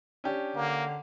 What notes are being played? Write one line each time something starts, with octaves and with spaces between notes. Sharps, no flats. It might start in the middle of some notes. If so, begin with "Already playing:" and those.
C#4 D4 G4
D3 A#3